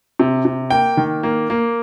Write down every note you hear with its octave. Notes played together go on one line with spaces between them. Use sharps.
C3
C3
A#3 G5
D#3
A#3
A#3